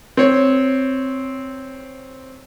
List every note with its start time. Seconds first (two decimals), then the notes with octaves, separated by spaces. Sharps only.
0.17 C4 C#5